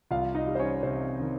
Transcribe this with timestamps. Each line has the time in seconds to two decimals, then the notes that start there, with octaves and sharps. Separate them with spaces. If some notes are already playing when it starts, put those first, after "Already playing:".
0.11 C2 F4 F5
0.35 D#4 D#5
0.47 G3
0.55 C5
0.59 C#4 C#5
0.83 C3 C4 C5
1.20 D#3